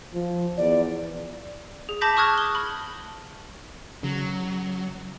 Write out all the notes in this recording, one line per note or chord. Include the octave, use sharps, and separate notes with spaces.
F3
E2 D5
G#4
A5 B5 D6 G6 A#6 B6
A5 C#6 D#6 F6 F#6 G#6
G7
B5
C#3 F#3